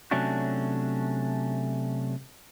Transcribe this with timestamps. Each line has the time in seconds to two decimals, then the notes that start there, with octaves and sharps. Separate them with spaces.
0.11 C3 F#3 A3 C#4 D4 F#4